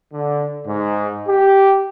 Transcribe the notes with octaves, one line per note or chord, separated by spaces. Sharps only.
D3
G#2
G4